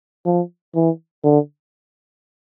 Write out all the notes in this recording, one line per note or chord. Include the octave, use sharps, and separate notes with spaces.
F3
E3
D3